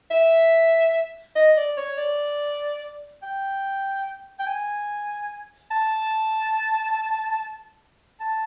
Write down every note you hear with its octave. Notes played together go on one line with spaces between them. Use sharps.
E5
D#5
D5
C#5
D5
G5
G5
G#5
A5
A5